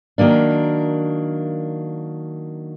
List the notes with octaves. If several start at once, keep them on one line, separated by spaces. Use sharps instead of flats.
D#3 F#3 A#3 D4